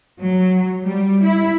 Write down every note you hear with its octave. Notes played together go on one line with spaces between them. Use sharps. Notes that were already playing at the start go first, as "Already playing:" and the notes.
F#3
G3
E4